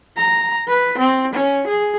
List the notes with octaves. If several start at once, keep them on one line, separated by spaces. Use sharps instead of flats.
A#5
B4
C4
C#4
G#4